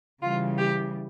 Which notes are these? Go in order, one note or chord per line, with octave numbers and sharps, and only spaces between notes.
C#3 E3 G3 F4
G4